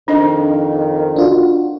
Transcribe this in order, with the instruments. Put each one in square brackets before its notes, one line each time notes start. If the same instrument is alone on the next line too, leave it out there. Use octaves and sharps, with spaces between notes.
[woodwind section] F2 D#3 [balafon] D4 D#5
[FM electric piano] D4 F4 F#4